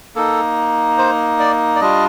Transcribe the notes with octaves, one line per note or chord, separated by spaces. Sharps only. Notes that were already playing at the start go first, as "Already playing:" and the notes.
A#3 D#4 A4
C5
D5
D5
G3 D4 F4 D#5